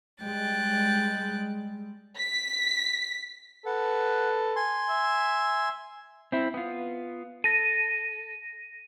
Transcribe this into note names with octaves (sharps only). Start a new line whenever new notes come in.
G3 G#3 G5 F#6 A6
B6
A4 B4 F#5
G#5 C6
E5
C4 E4
B3 F4
A4 A#6 D#7